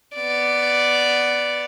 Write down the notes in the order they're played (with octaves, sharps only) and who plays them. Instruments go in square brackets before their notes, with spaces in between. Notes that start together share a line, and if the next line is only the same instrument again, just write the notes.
[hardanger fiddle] B3 D5